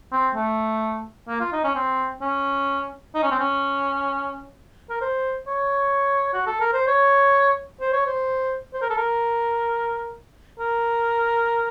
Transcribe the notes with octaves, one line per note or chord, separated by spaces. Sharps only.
C4
A3
A#3
F4
D#4
C#4
C4
C#4
D#4
C#4
C4
C#4
A#4
C5
C#5
F#4
A4
A#4
C5
C#5
C5
C#5
C5
C5
A#4
A4
A#4
A#4